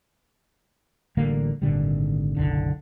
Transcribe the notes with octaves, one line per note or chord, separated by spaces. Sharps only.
A1 D3 G3 A#3
G#1 A#2 D3 G3
F#1 B1 D3